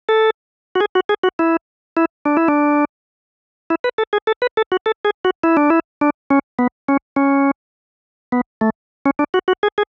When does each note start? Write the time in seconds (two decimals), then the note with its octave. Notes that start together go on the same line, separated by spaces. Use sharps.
0.09 A4
0.75 F#4
0.80 G#4
0.95 F#4
1.09 G#4
1.23 F#4
1.39 E4
1.97 E4
2.25 D4
2.37 E4
2.48 D4
3.70 E4
3.84 B4
3.98 A4
4.13 G#4
4.27 A4
4.42 B4
4.57 A4
4.72 F#4
4.86 A4
5.05 G#4
5.25 F#4
5.44 E4
5.57 D4
5.70 E4
6.01 D4
6.30 C#4
6.59 B3
6.88 C#4
7.16 C#4
8.32 B3
8.61 A3
9.06 C#4
9.19 D4
9.34 F#4
9.48 F#4
9.63 G#4
9.78 G#4